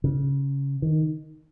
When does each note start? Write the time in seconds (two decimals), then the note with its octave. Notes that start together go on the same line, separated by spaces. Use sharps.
0.04 C#3
0.82 D#3